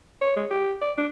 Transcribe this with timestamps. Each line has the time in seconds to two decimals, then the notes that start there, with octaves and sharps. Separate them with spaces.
0.22 C#5
0.36 G#3
0.51 G4
0.82 D5
0.98 D4